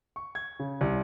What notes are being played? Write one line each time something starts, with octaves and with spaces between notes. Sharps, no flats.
C#6
G#6
C#3
C2